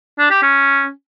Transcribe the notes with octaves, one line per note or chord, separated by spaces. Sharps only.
D4
G4
C#4